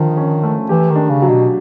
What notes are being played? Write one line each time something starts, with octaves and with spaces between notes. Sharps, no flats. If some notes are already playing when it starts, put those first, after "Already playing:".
Already playing: D3 D#3 F3
C#4
A3
E3 G4
D#3
D4
C#3
F#3
B2